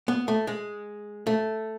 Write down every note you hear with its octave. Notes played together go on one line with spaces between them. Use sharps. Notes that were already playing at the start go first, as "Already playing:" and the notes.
B3
A3
G#3
A3